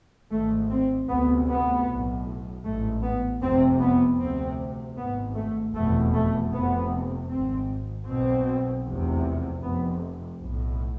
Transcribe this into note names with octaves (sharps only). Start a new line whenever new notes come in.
G#1 G#2 A3
C4
D2 C3 B3
B3
B1 A2
A1 G#2 A3
B3
F1 F2 C3 C4
B3
D2 C3 C4
G#1 G#2 B3
A3
F1 E2 B2 A3
A3
F1 F2 C3 B3
G#1 G#2 C4
B1 B2 C4
F1 E2 C3
F1 F2 C3 B3
B1 A2